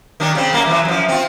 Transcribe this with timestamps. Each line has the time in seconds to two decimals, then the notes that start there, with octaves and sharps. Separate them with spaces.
0.20 D#3 F#3 D4
0.35 C#3 C4
0.53 F#2 A#3 A#4
0.67 E3 F#3
0.85 F#2 F3
1.08 C4 F4